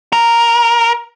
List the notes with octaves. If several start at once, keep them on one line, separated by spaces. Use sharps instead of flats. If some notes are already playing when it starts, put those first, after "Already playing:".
A#4